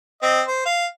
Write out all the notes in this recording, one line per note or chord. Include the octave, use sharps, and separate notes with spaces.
C4 D#5
C5
F5